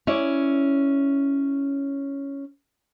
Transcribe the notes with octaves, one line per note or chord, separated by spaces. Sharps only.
C#4 E4 C#5 D5